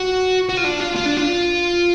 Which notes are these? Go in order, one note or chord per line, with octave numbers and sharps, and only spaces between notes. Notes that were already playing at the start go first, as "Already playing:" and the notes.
Already playing: F#4
F#4
F4
D4
F4
F4
D4
F4